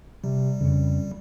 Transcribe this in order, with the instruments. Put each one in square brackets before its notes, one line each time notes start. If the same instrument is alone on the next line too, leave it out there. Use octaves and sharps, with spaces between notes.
[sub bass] C3 [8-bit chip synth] G3
[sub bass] F2 [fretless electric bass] C#3